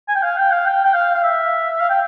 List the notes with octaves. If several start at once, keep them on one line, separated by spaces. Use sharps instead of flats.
G#5
G5
F5
G5
F5
G5
G5
F5
F5
E5
F5
G5